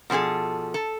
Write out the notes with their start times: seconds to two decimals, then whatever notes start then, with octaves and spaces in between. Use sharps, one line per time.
0.10 B2 F3 C#4 G#4 A4
0.74 A4